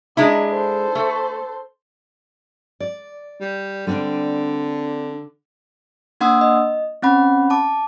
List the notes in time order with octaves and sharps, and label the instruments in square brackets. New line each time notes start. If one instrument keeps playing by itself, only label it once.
[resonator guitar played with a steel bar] G#3 D4 E4 [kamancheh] D#5 A#5
[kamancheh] A4 C5
[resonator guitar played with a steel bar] A3
[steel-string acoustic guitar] D5
[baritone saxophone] G3
[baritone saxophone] D3 [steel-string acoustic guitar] G3 C4 D4
[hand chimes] A#3 D4 F#5 C6 D#6 E6
D#5
C4 C#4 F#5 B5
A5 D6